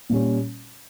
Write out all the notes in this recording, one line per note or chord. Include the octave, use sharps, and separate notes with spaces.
A#2 G3 C#4